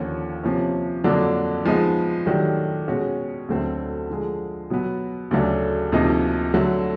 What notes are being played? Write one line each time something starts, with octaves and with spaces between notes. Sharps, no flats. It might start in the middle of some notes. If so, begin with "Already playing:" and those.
Already playing: D#2 D3 F3 A#3 C#4
C3 F3 A#3 C#4
F2 D3 F#3 A#3 D4
F3 G#3 B3 D#4
D#3 F#3 A3 D4 G4
B2 G#3 C#4 F#4
D2 D3 F#3 A3 C4
D3 F3 G#3
B2 F#3 B3
D2 C#3 F#3 A3 D4
D2 C3 F3 A#3 D#4
D3 F#3 A3